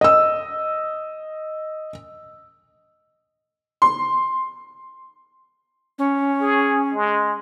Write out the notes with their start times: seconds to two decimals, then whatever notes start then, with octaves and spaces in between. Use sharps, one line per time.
0.01 D#5 E6
3.82 C6
5.99 C#4
6.41 G#4
6.94 G#3